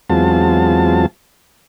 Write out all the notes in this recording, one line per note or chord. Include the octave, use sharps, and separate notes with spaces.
E2 F#3 G#3 C4 F4 A5